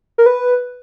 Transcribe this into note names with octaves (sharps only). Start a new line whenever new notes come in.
A#4
B4